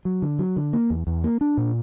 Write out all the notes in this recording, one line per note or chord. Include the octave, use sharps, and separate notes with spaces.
F#3
D3
F#3
D3
A#3
E2
E2
A#3
D4
A#2